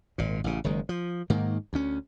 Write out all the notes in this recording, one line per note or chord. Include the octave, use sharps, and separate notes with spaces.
G#1 A#2
A1 C#3
F#1 D#3 G#3
F3
G#2 D#3 A#3
D2 C#4